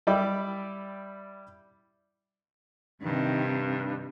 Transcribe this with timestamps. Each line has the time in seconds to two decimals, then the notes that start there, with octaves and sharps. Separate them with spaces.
0.07 G3 E4 D5 G5 B5
3.02 G2 C3 D#3